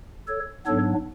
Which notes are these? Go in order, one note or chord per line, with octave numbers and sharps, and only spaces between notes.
A4 C#5
G#2 F#3 B3 D4 A4 C#5